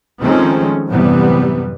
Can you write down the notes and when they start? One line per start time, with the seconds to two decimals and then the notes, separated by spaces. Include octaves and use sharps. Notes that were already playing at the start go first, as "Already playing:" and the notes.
0.20 D#3 F3 G#3 A3 C4 C#4
0.87 A1 F#2 C3 E3 G3 B3